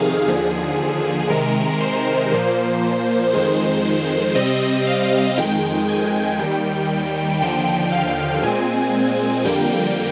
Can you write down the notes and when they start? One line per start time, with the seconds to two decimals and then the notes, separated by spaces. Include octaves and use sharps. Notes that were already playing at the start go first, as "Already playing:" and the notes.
Already playing: F2 C3 D#3 G#4 F5
0.28 D#2 D3 F3
1.30 C3 D#3 G#3 A#4
1.81 C5
2.31 A#2 F3 A#3
3.33 F2 D#3 G#3 C5
4.35 C3 G3 C4 D#5
4.87 F5
5.37 F2 D#3 G#3 G5
5.89 G#5
6.39 D#2 D#3 G3 G5
7.41 D#2 D3 F3 G5
7.92 F5
8.43 A#2 G#3 C4 G#5
9.45 F2 D3 G3 A#3 G5